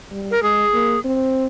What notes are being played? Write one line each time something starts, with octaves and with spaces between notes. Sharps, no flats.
G3
A#4
G#3 G#4
A#3
C4